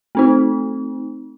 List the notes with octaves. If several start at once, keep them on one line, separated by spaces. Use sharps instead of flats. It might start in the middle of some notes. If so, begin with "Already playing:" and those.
A3 C4 D#4